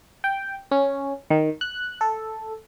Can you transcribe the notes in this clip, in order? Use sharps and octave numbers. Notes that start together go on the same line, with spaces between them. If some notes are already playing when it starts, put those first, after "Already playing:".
G5
C#4
D#3
F#6
A4